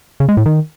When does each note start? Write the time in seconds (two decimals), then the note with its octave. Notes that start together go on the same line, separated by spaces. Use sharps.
0.20 C#3
0.29 G#3
0.37 A2
0.46 D#3